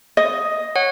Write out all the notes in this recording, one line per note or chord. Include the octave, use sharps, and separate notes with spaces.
D#5
C#5 F#5